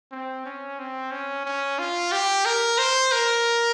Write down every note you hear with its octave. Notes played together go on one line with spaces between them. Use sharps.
C4
C#4
C4
C#4
C#4
F4
G4
A#4
C5
A#4